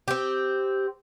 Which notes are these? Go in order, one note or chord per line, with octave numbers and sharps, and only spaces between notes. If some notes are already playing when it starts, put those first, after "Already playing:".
C4 G4